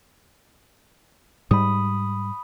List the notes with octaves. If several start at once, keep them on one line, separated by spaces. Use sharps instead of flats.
G#2 G3 B5 D#6